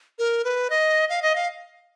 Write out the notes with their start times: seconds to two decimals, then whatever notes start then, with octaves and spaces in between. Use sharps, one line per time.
0.19 A#4
0.44 B4
0.70 D#5
1.09 F5
1.22 D#5
1.36 F5